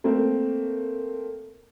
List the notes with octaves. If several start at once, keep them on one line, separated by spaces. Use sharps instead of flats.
A3 A#3 C4